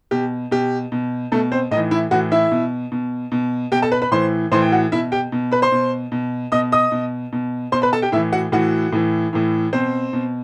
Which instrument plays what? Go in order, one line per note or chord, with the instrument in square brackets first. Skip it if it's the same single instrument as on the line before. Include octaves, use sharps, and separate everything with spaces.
[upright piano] B2 G4
B2 G4
B2
B2 A3 A4
C4 C5
A2 D#4 D#5
E3
E4 E5
A2 E3 F#4 F#5
E4 E5
B2
B2
B2
B2 G4 G5
A4 A5
B4 B5
B4 B5
A2 E3 C5 C6
A2 E3 C5 C6
G5
F#4 F#5
B2 E4 E5
G4 G5
B2
B4 B5
C5 C6
B2
B2
B2 D#5 D#6
D#5 D#6
B2
B2
B2 C5 C6
B4 B5
A4 A5
G4 G5
A2 E3 E4 E5
F#4 F#5
A2 E3 F#4 F#5
A2 E3
A2 E3
B2 C4 C5
B2